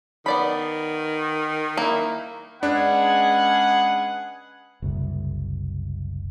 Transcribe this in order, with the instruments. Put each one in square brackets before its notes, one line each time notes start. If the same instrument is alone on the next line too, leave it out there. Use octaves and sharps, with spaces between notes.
[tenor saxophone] D#3 [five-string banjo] B3 D5 B5
[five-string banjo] A#3 E4
[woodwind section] G#3 C#4 G#4 [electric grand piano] D4 [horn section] B4 F#5
[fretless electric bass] F#1 C2